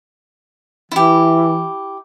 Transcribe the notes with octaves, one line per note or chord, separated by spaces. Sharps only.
E3 E4 G4